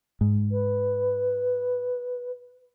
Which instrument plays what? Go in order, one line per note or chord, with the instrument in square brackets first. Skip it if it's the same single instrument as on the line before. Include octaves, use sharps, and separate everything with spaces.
[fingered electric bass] G#2
[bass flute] B4